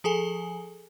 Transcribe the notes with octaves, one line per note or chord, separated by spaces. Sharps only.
F3 G#4 A4 G#5